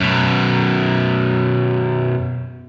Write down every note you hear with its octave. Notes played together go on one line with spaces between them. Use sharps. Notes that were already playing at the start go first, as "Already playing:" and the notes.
F#2 B2